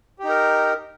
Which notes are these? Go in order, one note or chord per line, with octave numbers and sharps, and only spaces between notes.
D#4 G4 A#4